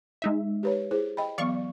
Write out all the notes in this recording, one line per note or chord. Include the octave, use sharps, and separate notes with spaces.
G#3 D#4 E5
G4 B4 C#5
E4 G#4 C5
D#5 G5 B5
E3 F#3 B3 D5 F5 C#6